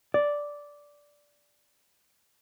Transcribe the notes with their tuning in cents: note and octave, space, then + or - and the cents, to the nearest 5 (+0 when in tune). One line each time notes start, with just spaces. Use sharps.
D5 -5